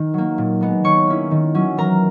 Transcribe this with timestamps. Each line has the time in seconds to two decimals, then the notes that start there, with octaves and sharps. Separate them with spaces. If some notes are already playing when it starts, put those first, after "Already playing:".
Already playing: D#3 D#4
0.14 F#3 A#3
0.38 A#2
0.61 G#3 B3 D#4
0.84 D#3 C#5 C#6
1.07 A#3 C#4 E4
1.31 D#3
1.54 F#3 C#4 E4
1.77 E3 A#4 A#5